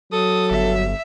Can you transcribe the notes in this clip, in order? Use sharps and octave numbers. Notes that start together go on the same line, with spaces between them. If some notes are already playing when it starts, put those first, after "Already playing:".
F#3 A4 D#6
G1 E5